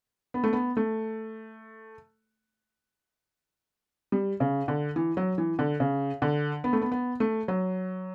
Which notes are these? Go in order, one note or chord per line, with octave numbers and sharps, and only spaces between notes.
B3
A3
B3
A3
G3
C#3
D3
E3
F#3
E3
D3
C#3
D3
B3
A3
B3
B3
A3
F#3